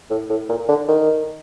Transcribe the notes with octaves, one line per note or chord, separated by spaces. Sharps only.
A2
A2
A#2
D3
D#3